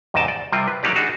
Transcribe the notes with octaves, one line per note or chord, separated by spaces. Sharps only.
E2 G#2 C3 D#5 G5 A5
D5
C3 G3 C4 F4 A#4
B4
E3 F#3 A#3 D#4 G4 D5
D4 D#4 F#4 G#4